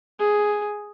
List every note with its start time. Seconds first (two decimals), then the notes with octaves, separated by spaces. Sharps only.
0.19 G#4